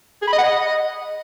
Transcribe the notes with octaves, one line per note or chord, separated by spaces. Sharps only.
G#4
B5
D#5
F#5
D#5